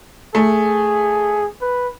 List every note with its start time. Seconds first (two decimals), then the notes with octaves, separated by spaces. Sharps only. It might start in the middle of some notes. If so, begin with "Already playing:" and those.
0.35 A3 G#4
1.61 B4